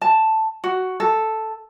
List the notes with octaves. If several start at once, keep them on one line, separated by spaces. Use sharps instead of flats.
A5
F#4
A4